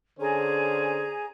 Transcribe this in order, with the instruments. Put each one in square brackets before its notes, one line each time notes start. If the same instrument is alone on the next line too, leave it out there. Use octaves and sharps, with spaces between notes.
[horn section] D3 C#4 C5 [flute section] G#4 G#5 A#5